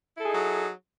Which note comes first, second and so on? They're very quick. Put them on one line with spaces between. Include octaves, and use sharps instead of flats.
E4 A4 G#4 D#4 F#3